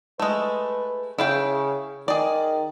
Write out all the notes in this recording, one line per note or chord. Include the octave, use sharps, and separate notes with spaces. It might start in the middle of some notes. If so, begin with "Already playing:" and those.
G#3 A3 B4
C#3 E4 F5 G5
D#3 G#4 D5